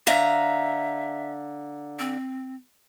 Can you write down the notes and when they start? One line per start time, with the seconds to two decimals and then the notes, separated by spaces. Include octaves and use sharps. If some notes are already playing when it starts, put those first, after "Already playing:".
0.07 D3 E5 F5 A#5
1.99 C4